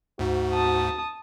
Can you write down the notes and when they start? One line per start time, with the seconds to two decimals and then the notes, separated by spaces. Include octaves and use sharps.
0.19 D2 G#2 F#4
0.54 A5 D#6